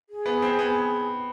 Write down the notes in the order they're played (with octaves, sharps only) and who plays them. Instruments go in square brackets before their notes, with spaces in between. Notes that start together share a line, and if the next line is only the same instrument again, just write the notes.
[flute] G#4
[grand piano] B3
C4
B3